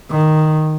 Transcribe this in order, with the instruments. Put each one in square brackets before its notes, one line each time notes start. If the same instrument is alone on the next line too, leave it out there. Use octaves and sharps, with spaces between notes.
[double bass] D#3